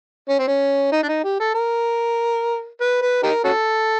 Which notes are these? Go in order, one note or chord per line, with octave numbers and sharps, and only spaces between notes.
C#4
C4
C#4
D#4
D4
D#4
G4
A4
A#4
B4
B4
D#4 G4 A#4
C#4 F#4 A4